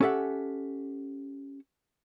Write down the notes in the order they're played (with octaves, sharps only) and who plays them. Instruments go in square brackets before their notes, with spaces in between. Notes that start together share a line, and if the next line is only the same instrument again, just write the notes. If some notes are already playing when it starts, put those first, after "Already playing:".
[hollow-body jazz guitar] C#4 G4 A4 E5 F#5